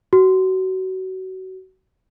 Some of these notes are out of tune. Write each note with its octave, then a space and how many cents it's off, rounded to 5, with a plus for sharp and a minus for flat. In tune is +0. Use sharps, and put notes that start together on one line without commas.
F#4 +25